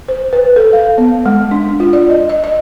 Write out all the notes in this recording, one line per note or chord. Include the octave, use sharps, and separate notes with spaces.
C5
B4
A4
F5
B3
G#3
D4
F4
D5
D#5
D#5
D#5